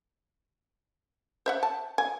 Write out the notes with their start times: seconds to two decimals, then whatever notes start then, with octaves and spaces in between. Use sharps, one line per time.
1.46 C5 E5 F#5
1.63 A5
1.98 G#5